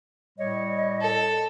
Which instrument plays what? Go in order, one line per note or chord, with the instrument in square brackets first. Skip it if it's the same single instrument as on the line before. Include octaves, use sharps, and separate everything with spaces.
[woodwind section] A2 G3 C#5 [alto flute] D#5
[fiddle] A4